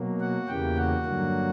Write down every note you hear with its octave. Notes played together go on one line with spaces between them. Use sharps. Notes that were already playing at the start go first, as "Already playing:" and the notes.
Already playing: B2 F#3 A#3
F#4 F#5
E2 C#3 E3 A#3 G4 G5
F#4 F#5
G2 D3 F#3 A#3